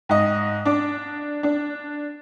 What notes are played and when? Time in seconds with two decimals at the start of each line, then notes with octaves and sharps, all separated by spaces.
0.09 G#2 D#5
0.65 D4 D6
1.43 D4